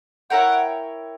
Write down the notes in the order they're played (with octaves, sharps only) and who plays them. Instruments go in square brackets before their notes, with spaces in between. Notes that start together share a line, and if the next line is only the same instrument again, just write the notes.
[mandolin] E4 A#4 C#5 G5 [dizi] F#5